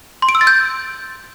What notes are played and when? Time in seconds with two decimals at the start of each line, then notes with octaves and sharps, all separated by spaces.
0.22 C6
0.29 D7
0.35 E6
0.41 A6
0.47 G6